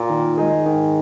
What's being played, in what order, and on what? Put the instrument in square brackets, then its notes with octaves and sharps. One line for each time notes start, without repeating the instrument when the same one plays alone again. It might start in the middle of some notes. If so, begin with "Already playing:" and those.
Already playing: [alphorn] A#2
[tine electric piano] D#3
G#3 D#4 G#4
[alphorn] G#2 [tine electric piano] D#3